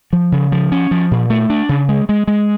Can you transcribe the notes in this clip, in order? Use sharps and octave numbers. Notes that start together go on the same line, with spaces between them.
F3
C#3
F3
C#4
F3
A#2
A3
D4
C#3
G#3
G#3
G#3